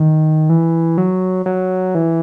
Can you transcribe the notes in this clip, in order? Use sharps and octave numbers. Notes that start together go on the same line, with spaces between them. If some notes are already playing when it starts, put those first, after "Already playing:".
Already playing: D#3
E3
F#3
F#3
E3